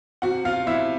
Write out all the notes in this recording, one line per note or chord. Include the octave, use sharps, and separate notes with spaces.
C3 F#4 F#5
C3 F4 F5
C3 E4 E5